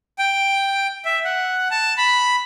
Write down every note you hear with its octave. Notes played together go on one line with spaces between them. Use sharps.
G5
E5
F#5
A5
B5